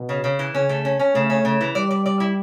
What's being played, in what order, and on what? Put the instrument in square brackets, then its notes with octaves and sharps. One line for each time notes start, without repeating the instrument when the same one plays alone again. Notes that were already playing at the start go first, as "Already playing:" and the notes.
Already playing: [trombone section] B2
[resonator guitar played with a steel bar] C#3
C#3
E3
[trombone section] C#3 [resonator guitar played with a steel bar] C#4
[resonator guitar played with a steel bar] A3
C#4
C#4
[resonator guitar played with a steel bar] C#3 [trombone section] A3
[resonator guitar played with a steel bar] C#4
C#3
E3
[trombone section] G3 [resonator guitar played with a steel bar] D5
[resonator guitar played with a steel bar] D5
D5
E4